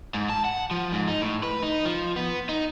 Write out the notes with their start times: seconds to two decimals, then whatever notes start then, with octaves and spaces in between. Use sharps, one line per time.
0.14 G#2
0.30 A5
0.44 F#5
0.71 F3
0.92 G#2
1.08 D#4
1.21 A2
1.43 B4
1.63 D#4
1.85 F3
2.16 B3
2.49 D#4